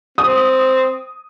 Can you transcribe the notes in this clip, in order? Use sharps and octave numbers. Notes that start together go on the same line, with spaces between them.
C4 D#6